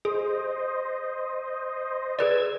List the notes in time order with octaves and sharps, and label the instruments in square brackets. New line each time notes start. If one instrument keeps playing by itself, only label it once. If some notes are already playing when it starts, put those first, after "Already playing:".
[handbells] G#4 [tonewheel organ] C5 D#5
[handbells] G#4 B4 D5 [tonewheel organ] E6 G#6